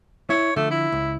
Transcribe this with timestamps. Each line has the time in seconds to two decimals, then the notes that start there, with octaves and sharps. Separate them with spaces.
0.30 E4 C#5
0.56 D3 F3 A3
0.71 E4
0.92 C#2